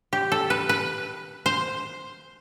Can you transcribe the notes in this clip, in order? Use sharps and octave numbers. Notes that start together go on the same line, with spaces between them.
G4
A4
B4
B4
C5